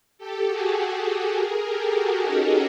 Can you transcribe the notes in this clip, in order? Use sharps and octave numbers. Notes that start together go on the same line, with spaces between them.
G4 A4
F#4 G#4
G4 A4
G4 A4
G#4 A#4
G4 A4
F#4 G#4
C#4 D#4